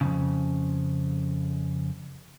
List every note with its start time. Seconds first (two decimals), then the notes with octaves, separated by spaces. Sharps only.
0.01 F2 A2 C#3